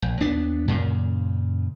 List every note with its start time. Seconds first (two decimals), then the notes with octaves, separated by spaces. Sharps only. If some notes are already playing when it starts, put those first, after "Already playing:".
0.02 A#1
0.20 D#2 B3 D4
0.68 F#2 A#2 C#3